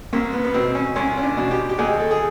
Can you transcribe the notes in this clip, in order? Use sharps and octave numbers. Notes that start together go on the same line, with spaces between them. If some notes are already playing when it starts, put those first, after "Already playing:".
C2 A#3
B3
B3
B2 C4
C#4
C2 C#4
C#4
D4
B2
G4
G4
D#2 G#4
A4
G#4